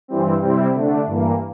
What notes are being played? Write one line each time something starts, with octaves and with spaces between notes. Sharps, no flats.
G2 E3 G3 C4
C3 G3 C4 E4
D3 A3 D4
G2 E3 A#3